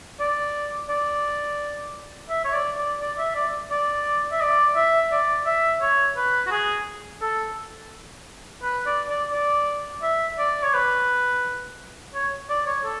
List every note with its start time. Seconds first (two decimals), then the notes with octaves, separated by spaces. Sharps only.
0.20 D5
0.89 D5
2.30 E5
2.45 C#5
2.53 D5
2.77 D5
3.00 D5
3.18 E5
3.35 D5
3.71 D5
4.32 E5
4.41 D5
4.76 E5
5.12 D5
5.46 E5
5.81 C#5
6.17 B4
6.47 F#4
6.51 G#4
7.21 A4
8.63 B4
8.86 D5
9.09 D5
9.33 D5
10.03 E5
10.38 D5
10.63 C#5
10.74 B4
12.15 C#5
12.50 D5
12.66 C#5
12.85 A4